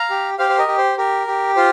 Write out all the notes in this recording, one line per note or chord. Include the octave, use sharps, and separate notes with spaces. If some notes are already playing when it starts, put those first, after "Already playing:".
Already playing: F5 A#5
G4
G4 C5 F5
C5
A#4 D#5
G4
C5
G4 A#4
G4
F4 C5